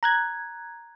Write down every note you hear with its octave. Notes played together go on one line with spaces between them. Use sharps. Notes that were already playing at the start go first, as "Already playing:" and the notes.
A#5 F#6 G#6